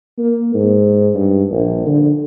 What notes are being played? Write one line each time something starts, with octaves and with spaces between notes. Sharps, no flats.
A#3
G#2
G2
A#1
D3